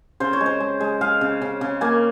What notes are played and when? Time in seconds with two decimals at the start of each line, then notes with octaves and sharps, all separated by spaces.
0.20 C#3 C5
0.33 C#5
0.41 G#3
0.46 C5
0.60 G#3
0.80 G#3
1.01 G#3 F5
1.21 C#3
1.42 C#3
1.61 C#3
1.81 A#3 G#5